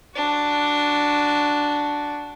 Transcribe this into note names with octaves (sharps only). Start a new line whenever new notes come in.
D4 F#4